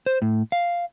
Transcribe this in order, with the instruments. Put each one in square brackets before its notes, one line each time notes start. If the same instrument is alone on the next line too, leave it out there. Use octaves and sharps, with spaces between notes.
[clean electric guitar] C5
A2
F5